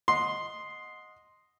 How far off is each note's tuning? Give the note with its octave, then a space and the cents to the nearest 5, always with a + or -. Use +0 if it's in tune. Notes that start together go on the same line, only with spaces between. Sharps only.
D#5 +0 F#5 -25 C6 +0